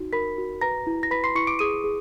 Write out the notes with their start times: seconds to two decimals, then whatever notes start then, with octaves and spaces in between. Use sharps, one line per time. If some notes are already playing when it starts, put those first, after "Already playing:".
Already playing: D#4 F#4
0.13 A#4 B5 B6
0.38 F#4
0.61 B4 A#5 A#6
0.87 E4
1.03 A#6
1.11 B4 B5 B6
1.24 C6 C7
1.35 E4 C#6 C#7
1.47 D6 D7
1.59 G#4 D#6 D#7
1.84 G#4